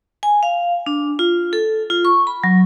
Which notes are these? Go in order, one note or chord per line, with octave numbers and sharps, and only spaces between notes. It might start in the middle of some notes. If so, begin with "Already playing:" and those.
G#5
F5
D4
F4
A4
F4
C#6
B5
F#3